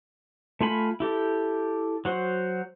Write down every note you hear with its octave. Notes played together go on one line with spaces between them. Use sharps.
A3 F4 G#5 B5
E4 G4 A4
F#3 F#4 C5